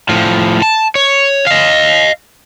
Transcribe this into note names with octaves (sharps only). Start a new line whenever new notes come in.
A2 F3
A5
C#5
D#5 F5